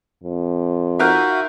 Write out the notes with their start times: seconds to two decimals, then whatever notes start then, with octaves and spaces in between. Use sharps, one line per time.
0.24 F2
0.99 D#4 F4 F#4 A#4 E5 F#6 G6